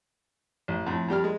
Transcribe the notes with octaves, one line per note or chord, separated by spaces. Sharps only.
A1
F2 A2
F2 G3 G4 F6
G#3